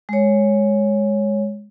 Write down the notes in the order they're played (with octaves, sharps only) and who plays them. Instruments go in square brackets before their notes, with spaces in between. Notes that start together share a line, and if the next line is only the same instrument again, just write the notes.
[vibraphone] G#3 C#5